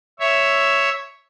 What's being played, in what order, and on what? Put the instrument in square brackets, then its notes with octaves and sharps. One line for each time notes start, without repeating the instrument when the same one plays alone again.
[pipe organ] C#5 E5